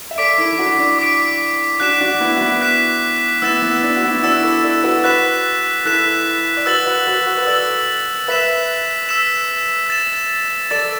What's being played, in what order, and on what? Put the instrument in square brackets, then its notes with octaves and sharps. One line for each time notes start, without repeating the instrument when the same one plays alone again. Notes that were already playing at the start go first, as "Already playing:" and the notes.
[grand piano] E5
[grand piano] A4 D5 [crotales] D6 B6 D7
[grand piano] E4 A4
E4
D4 F#4
D4
[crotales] D6 B6 D7
[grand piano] D4 F#4 [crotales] F#6 B6 E7
[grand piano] D4 F#4
B3 E4
F#4
B3 E4
[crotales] F#6 B6 E7
[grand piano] B3 E4 [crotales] E6 A6 E7
[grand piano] B3
D4
F#4
B3 E4
E4
[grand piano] D4 F#4 [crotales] E6 A6 E7
[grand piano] E4 A4
A4 D5
F#4 B4
[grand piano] F#4 B4 [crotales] F#6 B6 E7
[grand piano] E4 A4 [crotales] F#6 B6 E7
[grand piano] D5
[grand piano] F#4 B4 [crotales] E6 A6 F#7
[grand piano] F#4 B4
F#4 B4
F#4 B4
B4
[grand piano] A4 D5 [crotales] E6 A6 F#7
[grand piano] B4 E5 [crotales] E6 B6 E7
[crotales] E6 B6 E7
A6 E7
[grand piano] A4 D5 [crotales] A6 E7